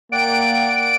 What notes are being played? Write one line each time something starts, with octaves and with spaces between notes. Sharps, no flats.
A#3 D5 F#5 G5 D7